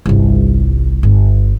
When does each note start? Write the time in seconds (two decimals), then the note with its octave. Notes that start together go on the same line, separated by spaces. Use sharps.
0.06 G1 C2
1.03 G1